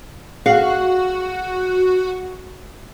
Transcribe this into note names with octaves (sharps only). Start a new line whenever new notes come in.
F#4 G#4 F5 F#5